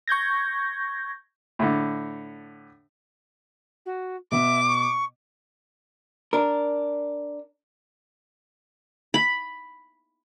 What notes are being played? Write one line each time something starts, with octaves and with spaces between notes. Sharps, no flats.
C#6 G6 G#6 A#6
A2 D3
F#4
B2 B3 E5 D6
C#6
D4 A#4
B5